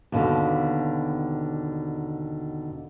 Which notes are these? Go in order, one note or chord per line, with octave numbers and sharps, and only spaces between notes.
D#2 B2 D3